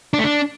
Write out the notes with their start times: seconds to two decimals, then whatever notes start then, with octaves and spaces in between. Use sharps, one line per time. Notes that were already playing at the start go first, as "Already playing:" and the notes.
0.14 D4
0.19 A3
0.24 D4